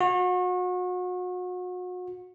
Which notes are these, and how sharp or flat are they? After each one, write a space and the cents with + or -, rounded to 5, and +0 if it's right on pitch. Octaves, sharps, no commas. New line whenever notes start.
F#4 -35